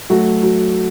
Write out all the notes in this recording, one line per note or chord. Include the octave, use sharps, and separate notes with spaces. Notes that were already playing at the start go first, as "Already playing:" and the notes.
F#3 A3 F#4
F#3